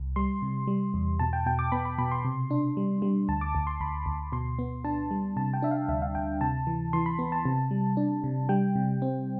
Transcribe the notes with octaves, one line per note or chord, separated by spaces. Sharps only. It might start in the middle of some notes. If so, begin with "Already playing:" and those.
Already playing: C2
G3 C6
C3
G3
E2
B2 A5
G5
B2 G5
D6
B3 B5
B5
B2 B5
C6
C3
D4
G3
G3
D2 A5
D6
D2
C6
D2 B5
D2
B2 C6
B3
D4 A5
G3
C3 A5
G5
D4 E5
F5
D2 E5
F5
D2 G5
C3 A5
E3
E3 C6
B5
B3
A5
C3
G3
D4
C3
G3 G5
C3
C4